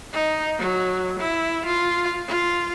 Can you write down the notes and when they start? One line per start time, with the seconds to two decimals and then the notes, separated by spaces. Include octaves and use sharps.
0.13 D#4
0.59 F#3
1.19 E4
1.66 F4
2.27 F4